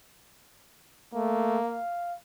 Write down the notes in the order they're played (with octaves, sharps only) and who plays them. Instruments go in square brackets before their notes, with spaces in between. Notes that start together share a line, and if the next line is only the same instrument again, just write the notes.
[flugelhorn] A3 [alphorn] A#3
[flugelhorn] F5